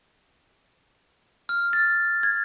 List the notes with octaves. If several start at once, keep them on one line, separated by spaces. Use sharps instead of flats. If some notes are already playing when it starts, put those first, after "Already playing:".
F6
A6
G#6